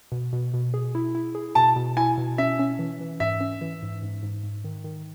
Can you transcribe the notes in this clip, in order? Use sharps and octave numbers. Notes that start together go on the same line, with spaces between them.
B2
B2
B2
G#4
E4
E4
G#4
B2 A5
B2
E4 G#5
B2
C#4 E5
C#4
E3
E3
G#2 E5
C#4
E3
G#2
G#2
G#2
G#2
D#3
D#3